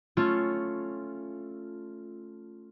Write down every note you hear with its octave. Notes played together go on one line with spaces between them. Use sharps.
A3 C#4 F4